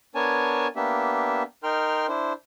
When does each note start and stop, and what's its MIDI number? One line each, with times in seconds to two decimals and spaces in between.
0.15 0.67 59
0.15 0.67 62
0.15 0.67 70
0.15 0.67 73
0.15 0.67 80
0.15 0.67 81
0.76 1.43 58
0.76 1.43 59
0.76 1.43 62
0.76 1.43 67
0.76 1.43 76
1.63 2.07 63
1.63 2.07 70
1.63 2.07 79
1.63 2.07 84
1.63 2.07 89
2.08 2.33 62
2.08 2.33 64
2.08 2.33 72